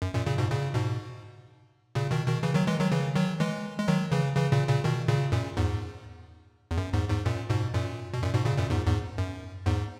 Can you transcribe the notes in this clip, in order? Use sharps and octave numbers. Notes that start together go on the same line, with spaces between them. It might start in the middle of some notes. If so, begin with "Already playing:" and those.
F#2
F#2 A#2
A#2 C#3
G#2 B2
A#2 C#3
G#2 B2
A#2 C#3
B2 D#3
B2 D#3
C#3 E3
D#3 F#3
E3 G#3
D#3 F#3
C#3 E3
D#3 F#3
E3 G#3
G#3
D#3 F#3
C#3 E3
C#3 E3
A#2 C#3
A#2 C#3
B2 D#3
A#2 C#3
F#2 A#2
E2 G#2
E2
F#2
E2 G#2
E2 G#2
F#2 A#2
G#2 B2
F#2 A#2
B2
F#2 A#2
G#2 B2
A#2 C#3
F#2 A#2
E2 G#2
E2 G#2
F#2
E2 G#2